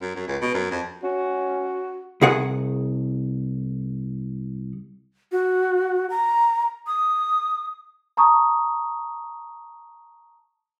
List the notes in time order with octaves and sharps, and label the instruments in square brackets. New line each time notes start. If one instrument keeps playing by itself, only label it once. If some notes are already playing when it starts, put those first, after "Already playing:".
[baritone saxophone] F#2
F#2
C#2
B2
F#2
F2
[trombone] C#4 [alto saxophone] F#4
[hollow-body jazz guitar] C2 G#4 F#5
[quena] F#4
A#5
D#6
[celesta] A5 A#5 C#6 D#6